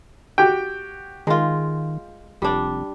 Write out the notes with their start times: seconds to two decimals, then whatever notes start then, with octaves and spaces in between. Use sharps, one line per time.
0.38 F#4 G4 G5
1.27 D#3 G#3 F4
2.42 F1 G3 D4